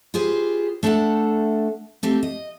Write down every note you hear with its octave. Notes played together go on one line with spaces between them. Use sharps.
F4 G4 G#4 B4 C5
A3 D4 A4 E5 F#5
A3 C4 G4
D#5